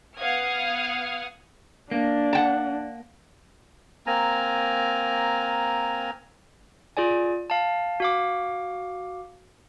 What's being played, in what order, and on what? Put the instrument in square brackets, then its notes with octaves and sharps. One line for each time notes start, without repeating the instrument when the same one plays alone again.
[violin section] B3 F5 F#5 D#6 F6 G#6
[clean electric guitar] A#3 [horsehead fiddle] D4
[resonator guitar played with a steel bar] F#5 G5 A5
[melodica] A#3 C4 G#5 A#5
[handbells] F4 G#4 D5 G#5
F5 A5
F#4 F5 D6